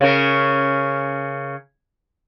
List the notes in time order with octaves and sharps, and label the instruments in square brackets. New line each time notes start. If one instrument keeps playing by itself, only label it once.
[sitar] C#3 C#4 A#4